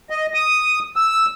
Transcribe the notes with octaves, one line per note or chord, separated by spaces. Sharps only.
D#5
D#6
E6